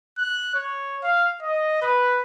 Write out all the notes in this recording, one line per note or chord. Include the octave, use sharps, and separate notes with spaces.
F#6
C#5
F5
D#5
B4